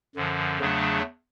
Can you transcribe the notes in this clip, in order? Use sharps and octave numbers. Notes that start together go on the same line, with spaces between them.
F#2 D3 F3
E2 C#3 F#3 A3 D4